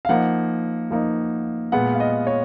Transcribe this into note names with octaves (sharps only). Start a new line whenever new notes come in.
F5
F3 A#3 D#4 F#5
F3 A#3 D#4
A#2 G#3 B3 F#5
F5
D#5
C#5